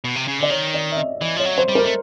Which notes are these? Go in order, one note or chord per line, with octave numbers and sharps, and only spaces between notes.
B2
C3
C#3
D3 D5
D#3 C#5
D5
E5
D#5
E3 D#5
F3 C#5
F#3
C5
G3
A#4
A3